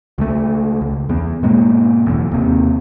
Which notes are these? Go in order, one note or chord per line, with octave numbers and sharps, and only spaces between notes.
C#2 G3 A3
C#2
E2 B3
G#2 B2 G#3 A#3
F#1 B1 E2
D#2 C3